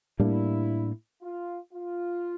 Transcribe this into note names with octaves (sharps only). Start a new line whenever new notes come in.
A2 G3 A#3 D4 E4
F4
F4